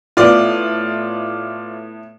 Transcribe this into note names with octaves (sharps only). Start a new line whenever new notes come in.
A2 B3 F4 D5